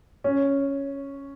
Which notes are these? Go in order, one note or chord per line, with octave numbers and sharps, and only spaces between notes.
C#4